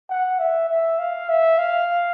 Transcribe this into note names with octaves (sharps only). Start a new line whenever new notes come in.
F#5
E5
E5
F5
E5
F5